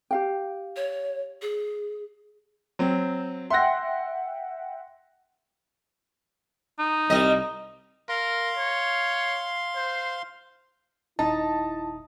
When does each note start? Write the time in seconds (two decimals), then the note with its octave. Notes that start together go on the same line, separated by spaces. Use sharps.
0.11 G4 F5 G5
0.76 C#5
1.42 G#4
2.79 F#3 C4
3.50 E5 F#5 G5 C6 A#6
6.79 D#4
7.10 C2 G3 D#5
8.09 A#4 F5 C6
8.57 C#5
9.75 C5
11.19 D#1 D#4 E4 A5